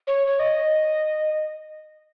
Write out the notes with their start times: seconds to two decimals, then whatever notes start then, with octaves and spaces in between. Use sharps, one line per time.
0.07 C#5
0.27 C#5
0.39 D#5